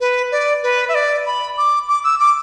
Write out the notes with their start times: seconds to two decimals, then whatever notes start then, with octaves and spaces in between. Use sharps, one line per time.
0.01 B4
0.32 D5
0.63 B4
0.89 E5
0.95 D5
1.26 B5
1.57 D6
1.88 D6
2.04 E6
2.20 D6